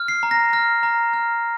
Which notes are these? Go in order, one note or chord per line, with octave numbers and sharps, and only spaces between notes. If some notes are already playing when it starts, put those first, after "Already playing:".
Already playing: F6
C7
A#5
A#6
F6 A#6
A#5
F6